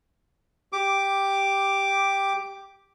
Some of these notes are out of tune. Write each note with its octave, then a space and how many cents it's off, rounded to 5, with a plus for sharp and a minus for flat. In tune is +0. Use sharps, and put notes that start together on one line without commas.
G4 +0 D6 +0